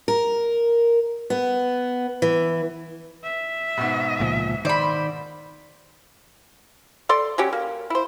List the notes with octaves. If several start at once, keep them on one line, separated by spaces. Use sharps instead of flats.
A#4
B3
E3
E5
G#2 B2
C#2 A#2 F3
D#3 C5 D5 B5
A4 D5 C6
F#3 C#4 G4
A#3
E4 C5